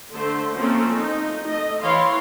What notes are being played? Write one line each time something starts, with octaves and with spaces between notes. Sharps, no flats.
D3 A3 C5
F3 A3 A#3 C4 C#4
D#4
A3 D#5
E3 C#5 F5 C6